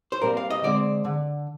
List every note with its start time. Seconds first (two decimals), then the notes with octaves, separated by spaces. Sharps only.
0.12 C5
0.22 A#2 G3 C4 A#4
0.37 F5
0.50 D#5
0.63 D3 G#3 C4 D5
1.05 D3